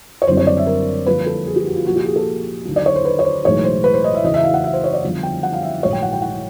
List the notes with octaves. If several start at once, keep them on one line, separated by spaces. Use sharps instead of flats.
C#5
F#1 F#2 D3 G3 C4 C5
C#5
D5
E5
A#4
F2 D3 G3 A#3 B4
A4
G#4
G4
F#4
F4
C2 A#2 F3 A#3 F#4
G4
G#4
A4
D#2 D3 F#3 A#3
D5
C#5
C5
B4
C#5
C5
B1 A2 E3 G#3 C#5
C5
B4
C5
D#5
E5
E2 C#3 E3 D#5
E5
F5
F#5
E5
C5
C#5
D5
F2 D3 G3 B3
G5
F#5
F5
E5
A#1 G#2 D#3 F#3 A3 C#5
G5
F#5
G5
F#5